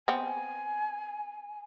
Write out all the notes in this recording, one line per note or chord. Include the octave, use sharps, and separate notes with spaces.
B3 C4 G#5